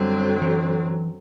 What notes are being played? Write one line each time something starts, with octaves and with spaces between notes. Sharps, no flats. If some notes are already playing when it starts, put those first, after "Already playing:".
Already playing: F#2 D3 F#3 G3 C4
E3